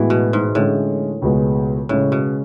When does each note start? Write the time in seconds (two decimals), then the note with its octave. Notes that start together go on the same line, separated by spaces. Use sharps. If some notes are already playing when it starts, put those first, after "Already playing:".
Already playing: A2 E3 G#3 B3 F#4
0.10 B2
0.33 G#2
0.55 A2 D3 G#3 C#4
1.22 C#2 B2 G#3 B3 F#4
1.89 A2 C#3 G#3 C#4
2.12 B2